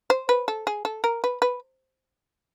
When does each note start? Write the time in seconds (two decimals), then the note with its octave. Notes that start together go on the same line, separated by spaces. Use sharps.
0.10 C5
0.29 B4
0.48 A4
0.67 G#4
0.85 A4
1.04 A#4
1.24 B4
1.42 B4